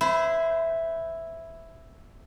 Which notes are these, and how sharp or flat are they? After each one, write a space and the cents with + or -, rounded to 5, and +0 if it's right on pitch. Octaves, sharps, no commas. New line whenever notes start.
E4 +0 C5 -30